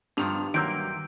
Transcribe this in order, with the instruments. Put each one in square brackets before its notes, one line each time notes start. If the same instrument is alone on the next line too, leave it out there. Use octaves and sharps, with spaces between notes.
[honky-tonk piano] G2 F7 [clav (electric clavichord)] D3 D#3 F3
[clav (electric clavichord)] C3 A#3 [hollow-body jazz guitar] D#3 F#3 [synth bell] E6 G6 D7